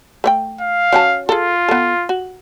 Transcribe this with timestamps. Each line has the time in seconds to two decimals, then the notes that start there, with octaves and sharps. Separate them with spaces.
0.24 A3 C#5 G5
0.61 F5
0.92 F#3 C#4 A5
1.29 F4 G#4 A4
1.69 B3 A4
2.09 F#4